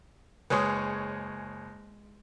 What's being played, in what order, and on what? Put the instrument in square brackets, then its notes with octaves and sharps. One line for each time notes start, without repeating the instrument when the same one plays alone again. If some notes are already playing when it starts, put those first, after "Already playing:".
[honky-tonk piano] F#1 G#4 C#5 [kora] G#3 B4